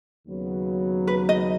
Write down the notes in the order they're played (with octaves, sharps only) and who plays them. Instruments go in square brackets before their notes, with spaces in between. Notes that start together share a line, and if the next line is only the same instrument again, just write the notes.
[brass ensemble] D#2 C#3 F#3 B3
[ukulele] B4
D#5